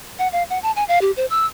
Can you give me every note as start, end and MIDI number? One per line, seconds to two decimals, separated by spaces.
0.19 0.28 78
0.33 0.43 77
0.50 0.59 78
0.63 0.71 81
0.76 0.84 80
0.88 0.99 77
1.01 1.11 67
1.17 1.26 72
1.30 1.46 88